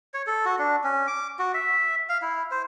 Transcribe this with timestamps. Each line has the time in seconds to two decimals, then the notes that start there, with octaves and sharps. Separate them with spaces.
0.14 C#5
0.27 A4
0.45 F#4
0.59 D4
0.84 C#4
1.07 D6
1.39 F#4
1.54 E5
2.09 F5
2.22 E4
2.51 C5